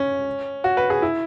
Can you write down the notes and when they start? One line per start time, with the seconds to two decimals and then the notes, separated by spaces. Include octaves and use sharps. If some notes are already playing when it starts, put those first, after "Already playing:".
Already playing: C#4
0.64 F#4
0.77 B4
0.90 G#4
1.02 E4